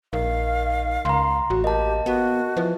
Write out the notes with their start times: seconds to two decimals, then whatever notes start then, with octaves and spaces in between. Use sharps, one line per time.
0.13 A#1 D#3 F5
1.05 C#2 A#5 C6
1.50 A1 F#4
1.64 A#3 G4 D#5 A5
2.06 B3 F#4
2.57 E3 F3